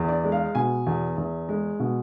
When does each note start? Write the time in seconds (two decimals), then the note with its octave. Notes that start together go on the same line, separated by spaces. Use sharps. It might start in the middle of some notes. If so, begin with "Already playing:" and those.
Already playing: E2
0.08 D5
0.24 G#3
0.32 F5
0.55 B2 G#5
0.86 E2
1.18 E2
1.49 G#3
1.80 B2